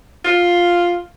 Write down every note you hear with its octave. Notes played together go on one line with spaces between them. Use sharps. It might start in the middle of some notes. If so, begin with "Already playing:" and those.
F4